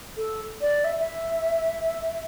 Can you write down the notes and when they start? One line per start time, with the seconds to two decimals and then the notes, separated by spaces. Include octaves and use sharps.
0.17 A4
0.61 D5
0.84 E5
0.99 E5